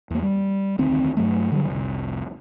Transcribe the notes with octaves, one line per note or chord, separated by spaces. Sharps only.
E2 A#3
G3
F1 D2 D#3 C4
G2 F#3 A3
D3 F#3 G3
F1 C2